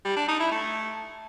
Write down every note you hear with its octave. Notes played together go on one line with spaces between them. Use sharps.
G3
D4
D#4
E4
A3